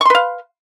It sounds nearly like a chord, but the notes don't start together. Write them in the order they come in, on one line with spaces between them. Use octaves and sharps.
C#6 C6 B4 F5